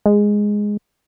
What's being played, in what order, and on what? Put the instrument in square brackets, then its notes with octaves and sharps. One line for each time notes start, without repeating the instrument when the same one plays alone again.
[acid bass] G#3